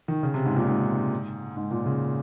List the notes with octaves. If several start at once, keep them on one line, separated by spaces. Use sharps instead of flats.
D#3
C#3
C3
G#2
A#2
G#2
G#2
A#2
C#3